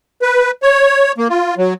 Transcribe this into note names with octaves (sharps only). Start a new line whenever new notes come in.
B4
C#5
A#3
F4
F#3